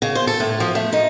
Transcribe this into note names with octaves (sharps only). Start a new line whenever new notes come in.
C#3
C5
A4
A2
F3
A3
D#4